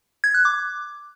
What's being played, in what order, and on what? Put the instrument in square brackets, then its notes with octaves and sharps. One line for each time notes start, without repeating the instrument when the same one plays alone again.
[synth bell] G#6
F#6
D6